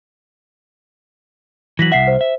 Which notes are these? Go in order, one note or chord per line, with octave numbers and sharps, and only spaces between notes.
E3 F#3 A#6 B6 F#7
C2 E5 F#5 B6 C7
C5
E5